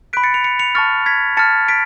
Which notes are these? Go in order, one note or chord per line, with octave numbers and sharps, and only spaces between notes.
B5 F#6 B6 D7
A6 C#7
C#7 F7
C#7 F7
C#7 F7
A5 C#6 F6 A6 C#7
G#6 B6
A5 F6 A6 C#7
B6 D7